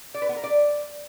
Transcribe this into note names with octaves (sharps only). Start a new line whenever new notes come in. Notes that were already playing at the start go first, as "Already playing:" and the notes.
D5
B4
B3
A#4
D5